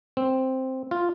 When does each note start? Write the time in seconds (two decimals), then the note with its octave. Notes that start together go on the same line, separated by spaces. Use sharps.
0.17 C4
0.91 F4